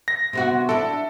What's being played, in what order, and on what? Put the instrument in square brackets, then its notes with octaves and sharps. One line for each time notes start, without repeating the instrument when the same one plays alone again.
[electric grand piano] A#6
[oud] C3 B3 F#4
[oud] D4 E4 [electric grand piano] A4